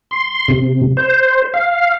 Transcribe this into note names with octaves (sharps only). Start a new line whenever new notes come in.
C6
C3
C5
F5